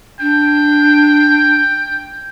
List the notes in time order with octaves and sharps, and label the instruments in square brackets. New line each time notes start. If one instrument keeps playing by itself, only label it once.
[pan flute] D4 [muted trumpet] G5